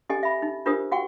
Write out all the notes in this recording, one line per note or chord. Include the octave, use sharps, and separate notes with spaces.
C#4 G4 A4 D#5 G#5
E5 B5
D#4
D4 F4 G4 A#4 C5 D#6
F#4 F#5 G5 C#6